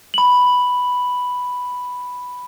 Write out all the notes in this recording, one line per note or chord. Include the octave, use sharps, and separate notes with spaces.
B5 F#7